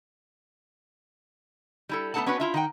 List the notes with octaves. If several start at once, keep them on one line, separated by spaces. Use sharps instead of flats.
G3 E4 A4
A3 B3 D#4 A4 F#5 A5
B3 C#4 D4 F#4 B4
E4 F4 E5
D#3 F#5 G5